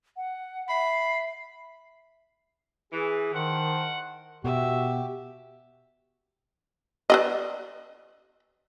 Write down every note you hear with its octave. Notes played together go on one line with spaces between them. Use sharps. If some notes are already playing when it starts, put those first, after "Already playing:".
F#5
E5 B5 C7
E3 G#4
D#3 A#4 C5 F#5 A5
B2 F#4 G4 E5
B4 D5 D#5